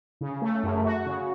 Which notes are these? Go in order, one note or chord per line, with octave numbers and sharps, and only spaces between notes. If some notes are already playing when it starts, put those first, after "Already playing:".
C#3
A3
F#2
F#4
C#3